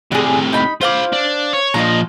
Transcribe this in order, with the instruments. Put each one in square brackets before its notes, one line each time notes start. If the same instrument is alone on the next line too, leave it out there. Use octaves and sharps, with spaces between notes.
[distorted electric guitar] A2 C3 [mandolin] D4 G#4
[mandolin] D#4 B5
[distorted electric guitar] F4 B5 [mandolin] C5 F5 D6
[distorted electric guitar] D4
C#5
[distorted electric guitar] A#2 F3 [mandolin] D#5 A#5